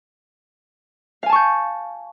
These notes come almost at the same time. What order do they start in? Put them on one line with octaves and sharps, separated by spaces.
F5 G#5 A5 C#6 G6